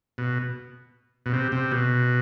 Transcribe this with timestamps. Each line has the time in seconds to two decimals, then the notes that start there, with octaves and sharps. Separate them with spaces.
0.18 B2
1.26 B2
1.33 C3
1.52 C3
1.72 B2